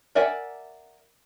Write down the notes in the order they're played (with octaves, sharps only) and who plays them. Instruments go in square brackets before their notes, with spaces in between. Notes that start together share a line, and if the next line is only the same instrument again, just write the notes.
[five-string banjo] A#4 D5 E5 F#5 G#5